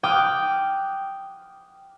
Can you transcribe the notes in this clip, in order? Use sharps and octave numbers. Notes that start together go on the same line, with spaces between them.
G5 D6 D#6 F6 F#6